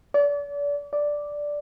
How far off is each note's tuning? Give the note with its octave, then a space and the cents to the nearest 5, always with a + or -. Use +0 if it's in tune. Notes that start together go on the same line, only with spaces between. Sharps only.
D5 -35
D5 +0